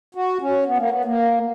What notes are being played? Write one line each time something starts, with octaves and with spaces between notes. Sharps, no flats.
F#4
C#4
B3
A#3
B3
A#3